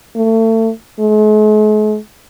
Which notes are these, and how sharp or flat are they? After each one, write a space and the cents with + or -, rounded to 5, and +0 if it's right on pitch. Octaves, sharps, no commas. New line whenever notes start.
A3 +30
G#3 +45